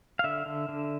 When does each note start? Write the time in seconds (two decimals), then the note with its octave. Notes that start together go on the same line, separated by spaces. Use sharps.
0.19 F5
0.24 D3 E5
0.46 D3
0.69 D3